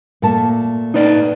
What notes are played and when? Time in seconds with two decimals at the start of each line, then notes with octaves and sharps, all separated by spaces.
0.22 A#2 A3 A5
0.94 D#4 B4 D5